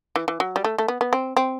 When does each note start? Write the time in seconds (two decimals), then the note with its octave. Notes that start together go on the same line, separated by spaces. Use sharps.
0.16 E3
0.28 E3
0.40 F#3
0.56 G3
0.64 A3
0.78 A3
0.88 B3
1.01 B3
1.13 C4
1.37 C4